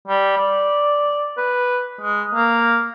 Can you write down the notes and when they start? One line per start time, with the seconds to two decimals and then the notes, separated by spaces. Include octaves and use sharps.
0.08 G3
0.38 D5
1.37 B4
2.01 G#3
2.35 A#3